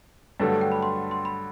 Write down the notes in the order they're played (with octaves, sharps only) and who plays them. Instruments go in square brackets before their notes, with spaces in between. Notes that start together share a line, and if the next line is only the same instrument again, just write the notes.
[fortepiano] G2 D3 F#3 A3 [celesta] B4
[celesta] A4
G5
B5
C6
C6
B5